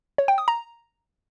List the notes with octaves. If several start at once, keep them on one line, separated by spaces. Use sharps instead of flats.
C#5
G5
D#6
A#5